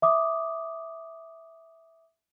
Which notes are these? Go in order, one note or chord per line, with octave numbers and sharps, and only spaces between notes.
E5 D6 D#6